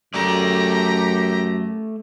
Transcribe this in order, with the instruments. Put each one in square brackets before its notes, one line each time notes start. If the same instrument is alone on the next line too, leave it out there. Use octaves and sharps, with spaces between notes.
[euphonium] F#2 [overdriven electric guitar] A3 D5 [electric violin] G4 A#5